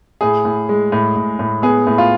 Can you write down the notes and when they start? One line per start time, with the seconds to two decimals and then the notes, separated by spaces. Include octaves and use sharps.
0.21 A2 G#4
0.45 A2
0.69 G#3
0.92 A2
1.16 A2
1.39 A2
1.62 B3 G#4
1.87 A2
1.98 F4